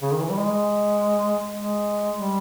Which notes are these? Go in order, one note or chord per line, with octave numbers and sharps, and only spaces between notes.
C#3
D#3
E3
G3
G#3
G#3
G3